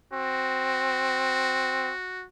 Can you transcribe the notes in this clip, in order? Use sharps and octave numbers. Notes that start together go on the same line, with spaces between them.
C4 F#4